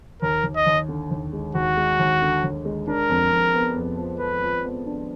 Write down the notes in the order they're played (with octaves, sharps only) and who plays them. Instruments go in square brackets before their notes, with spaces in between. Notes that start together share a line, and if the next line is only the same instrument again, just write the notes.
[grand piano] D#2 [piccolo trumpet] A#4
[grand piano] D#2
[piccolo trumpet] D#5
[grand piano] D#2
D3
D#2
G#3
[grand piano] D#2 [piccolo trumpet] F#4
[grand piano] G#3
D#2
D3
D#2
G#3
[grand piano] D4 [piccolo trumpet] A#4
[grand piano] F2
F2
B3
F2
F3
[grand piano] F3 [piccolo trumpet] B4
[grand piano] F3
B3
D4